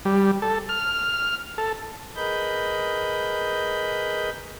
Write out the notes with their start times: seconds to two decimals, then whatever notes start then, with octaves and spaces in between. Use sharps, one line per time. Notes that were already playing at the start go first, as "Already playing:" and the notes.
0.05 G3
0.42 A4
0.69 F6
1.58 A4
2.15 G#4 A#4 B4 D#5 B5 G6